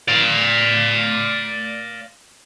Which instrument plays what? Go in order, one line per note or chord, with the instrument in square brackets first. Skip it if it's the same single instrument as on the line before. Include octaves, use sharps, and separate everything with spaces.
[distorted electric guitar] D5 F5